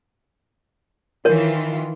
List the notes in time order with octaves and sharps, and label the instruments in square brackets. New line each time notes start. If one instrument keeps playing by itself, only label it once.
[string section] D#3 E3 F4 [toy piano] A#4 C#5